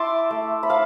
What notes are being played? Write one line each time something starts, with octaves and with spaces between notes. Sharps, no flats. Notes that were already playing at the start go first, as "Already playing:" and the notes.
Already playing: E4 A5 C6 D6
A3
B5
F5 A5